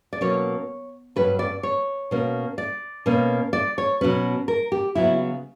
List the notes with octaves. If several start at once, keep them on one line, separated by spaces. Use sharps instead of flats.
D5
B2 F#3 A#3 C#4 C#5
G2 F#3 C#4 B4
D5
C#5
B2 A#3 C#4
D5
B2 A#3 C#4
D5
C#5
B2 F#3 C#4 B4
A#4
G4
C#3 F#3 B3 E4